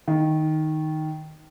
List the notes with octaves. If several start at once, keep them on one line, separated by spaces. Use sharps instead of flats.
D#3